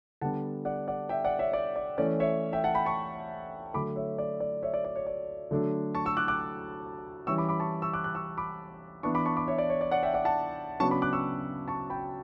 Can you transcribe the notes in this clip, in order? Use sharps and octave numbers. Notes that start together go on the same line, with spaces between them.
D3 G3 B3 D4 F#5 A5
D5 F#5
D5 F#5
E5 G5
D5 F#5
C#5 E5
D5
D5
E3 A3 C#4 D5
C#5 E5
E5 G5
F#5 A5
G5 B5
A5 C#6
D3 F#3 A3 B5 D6
C#5 E5
D5
D5
C#5 E5
D5
D5
C#5
D5
D3 F#3 A3 D4
A5 C#6
C#6 E6
D6 F#6
D6 F#6
E3 G3 C#4 C#6 E6
B5 D6
B5 D6
A5 C#6
C#6 E6
D6 F#6
D6 F#6
C#6 E6
B5 D6
E3 B3 D4 A5 C#6
B5 D6
A5 C#6
B5 D6
C#5 E5
D5
C#5
D5
D5 F#5
E5 G5
D5 F#5
F#5 A5
C#3 F#3 B3 D4 A5 C#6
B5 D6
D6 F#6
C#6 E6
A5 C#6
G5 B5